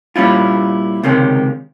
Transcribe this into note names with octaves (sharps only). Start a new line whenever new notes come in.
A#2 G3 C#4 E4 F4
C#2 C3 D#3 G#3 C#4